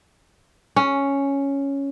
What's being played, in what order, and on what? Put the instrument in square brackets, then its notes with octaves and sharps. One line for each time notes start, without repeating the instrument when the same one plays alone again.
[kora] C#4